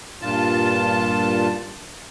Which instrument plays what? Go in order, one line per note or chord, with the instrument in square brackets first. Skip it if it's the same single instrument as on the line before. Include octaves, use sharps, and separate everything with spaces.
[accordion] G2 A#2 F4 A5